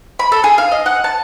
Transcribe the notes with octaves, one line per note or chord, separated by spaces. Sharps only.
B5
A4
G#4
F5
D#5
F#5
A5